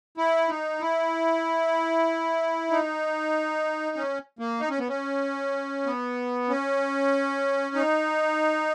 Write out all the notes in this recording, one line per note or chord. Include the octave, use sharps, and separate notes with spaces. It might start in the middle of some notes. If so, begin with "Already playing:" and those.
E4
D#4
E4
D#4
C#4
A#3
D#4
C#4
B3
C#4
B3
C#4
D#4